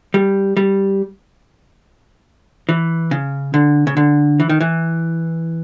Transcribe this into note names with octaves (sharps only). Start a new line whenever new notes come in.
G3
G3
E3
C#3
D3
C#3
D3
E3
D#3
E3